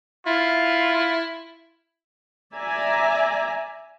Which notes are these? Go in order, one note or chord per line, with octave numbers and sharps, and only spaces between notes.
E4 F4
D5 E5 G#5 A#5